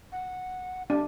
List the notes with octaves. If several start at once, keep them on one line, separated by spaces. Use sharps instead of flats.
F#5
D4 G4